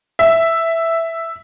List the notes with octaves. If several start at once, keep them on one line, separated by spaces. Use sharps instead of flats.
E5